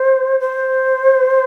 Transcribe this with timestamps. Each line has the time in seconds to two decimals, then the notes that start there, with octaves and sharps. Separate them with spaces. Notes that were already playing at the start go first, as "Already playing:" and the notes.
Already playing: C5
0.40 C5